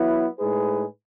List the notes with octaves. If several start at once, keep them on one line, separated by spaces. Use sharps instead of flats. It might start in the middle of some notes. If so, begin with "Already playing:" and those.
Already playing: F#3 B3 E4
A2 G#3 D#4 G#4 B4